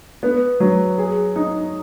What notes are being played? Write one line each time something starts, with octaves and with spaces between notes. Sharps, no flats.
B3
F#3
G#4
D#4